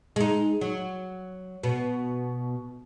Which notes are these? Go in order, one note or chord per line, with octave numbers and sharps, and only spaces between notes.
G#3 D#4
F#3
B2